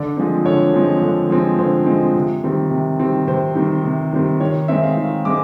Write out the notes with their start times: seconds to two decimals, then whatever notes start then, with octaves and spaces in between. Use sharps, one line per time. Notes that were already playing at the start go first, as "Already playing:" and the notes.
Already playing: D3 D5
0.17 F3 G#3 C4
0.46 D3 C#5
0.74 F3 G#3 C4
1.02 D3
1.30 F3 G#3 C4
1.59 D3 C5
1.86 F3 G#3 C4
2.16 C3
2.44 D#3 G3 C4
2.71 C3
2.99 D#3 G3 C4
3.27 C3 C5
3.55 D#3 G3 C4
3.84 C3
4.13 D#3 G3 C4
4.40 D#3 C#5
4.68 G#3 C4 E5
4.83 F5
4.97 D#3
5.25 G#3 C4 D6